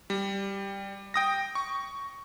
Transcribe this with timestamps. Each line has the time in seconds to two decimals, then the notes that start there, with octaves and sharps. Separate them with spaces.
0.10 G3
1.14 G5 D#6 A#6
1.55 C#6